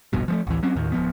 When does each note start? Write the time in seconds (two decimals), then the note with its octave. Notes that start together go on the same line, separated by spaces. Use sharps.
0.13 E1 A#1 G2 B2
0.28 F3 G#3 A3
0.47 A1 D2 E3
0.63 F#3 C4 C#4
0.75 D#2 A2 D#3
0.92 D1 F3 B3